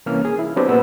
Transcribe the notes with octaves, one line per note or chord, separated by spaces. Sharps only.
C2 E3 A#3 C#4 F6
G#4
E4
F#3 B3 C4 D4 G4
A#2 A#3 B3 E6